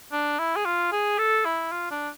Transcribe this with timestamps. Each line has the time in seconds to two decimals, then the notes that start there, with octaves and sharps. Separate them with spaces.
0.12 D4
0.39 E4
0.56 G#4
0.65 F4
0.92 G#4
1.18 A4
1.45 E4
1.72 F4
1.91 D4